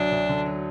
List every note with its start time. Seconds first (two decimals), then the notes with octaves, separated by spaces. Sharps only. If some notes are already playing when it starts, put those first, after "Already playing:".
Already playing: D2 F#3 D4
0.12 D2
0.29 D3
0.46 F#3